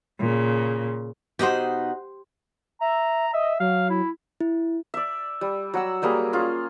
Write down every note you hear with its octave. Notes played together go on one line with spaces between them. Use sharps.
A#2 C#3
B2 D#4 G4 C5 F#5
E5 A#5
D#5 E5
F#3 F5
E4
E4
D5 E5
G3
F#3 F#5 E6
F#3 G3 A#3 G#4
C#4 F4 G#4